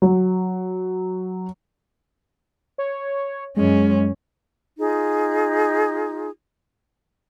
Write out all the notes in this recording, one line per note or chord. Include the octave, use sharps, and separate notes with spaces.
F#3
C#5
F#2 G#3 C#4
D#4 F4 G#4